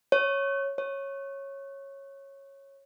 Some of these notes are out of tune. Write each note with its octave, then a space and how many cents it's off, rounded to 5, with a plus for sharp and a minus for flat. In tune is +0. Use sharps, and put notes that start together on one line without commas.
C#5 -5
C#5 -10